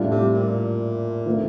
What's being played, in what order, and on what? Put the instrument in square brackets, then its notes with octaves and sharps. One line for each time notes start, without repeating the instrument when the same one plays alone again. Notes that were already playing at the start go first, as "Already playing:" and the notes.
Already playing: [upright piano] A2 G3 D4 F4
[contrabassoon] C3
A#2
[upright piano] D#3 A3 C4 F4